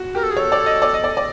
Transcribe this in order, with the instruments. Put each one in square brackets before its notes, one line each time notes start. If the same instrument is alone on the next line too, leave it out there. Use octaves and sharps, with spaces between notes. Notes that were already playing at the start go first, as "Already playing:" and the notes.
Already playing: [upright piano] F#4
[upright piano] G4 [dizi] A#4
[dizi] A4
G#4
[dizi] A4 [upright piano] C#5
[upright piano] D5
D#5
D5
D#5
D5
D5